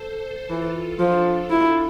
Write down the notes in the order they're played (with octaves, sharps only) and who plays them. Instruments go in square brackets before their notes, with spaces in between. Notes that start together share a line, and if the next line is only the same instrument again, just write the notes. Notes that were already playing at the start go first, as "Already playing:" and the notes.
Already playing: [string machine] A4 C5
[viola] E3 [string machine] F4 A4
[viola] F3 [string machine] D4 F4
[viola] E4